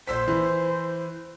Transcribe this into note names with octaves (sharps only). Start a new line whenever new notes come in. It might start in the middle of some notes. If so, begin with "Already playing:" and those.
A#1 C5 E6 B6
E3